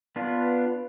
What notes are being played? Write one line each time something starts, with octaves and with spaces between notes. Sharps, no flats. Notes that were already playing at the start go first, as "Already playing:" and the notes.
B3 D4 F4